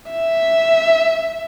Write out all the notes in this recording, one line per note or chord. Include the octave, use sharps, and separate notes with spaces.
E5